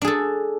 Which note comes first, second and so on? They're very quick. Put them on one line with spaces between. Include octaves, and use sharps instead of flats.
D4 G#4 A4